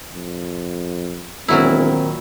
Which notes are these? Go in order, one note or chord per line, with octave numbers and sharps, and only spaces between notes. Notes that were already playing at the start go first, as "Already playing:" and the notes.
F2
E1 A#2 D#3 F#3 C4 E4